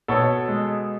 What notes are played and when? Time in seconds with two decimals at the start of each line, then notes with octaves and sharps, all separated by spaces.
0.08 B2 A4 C#5
0.48 G#3